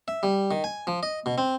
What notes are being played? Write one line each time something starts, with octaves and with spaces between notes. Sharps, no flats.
E5
G3
D#3
G#5
F3
D#5
B2
C4